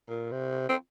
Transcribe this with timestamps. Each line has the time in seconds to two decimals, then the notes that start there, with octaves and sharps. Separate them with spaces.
0.09 A#2
0.31 C3
0.69 C4